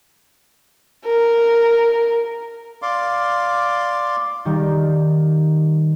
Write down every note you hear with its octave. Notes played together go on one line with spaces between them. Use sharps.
A#4
D5 F5 C6 D6
D#3 G3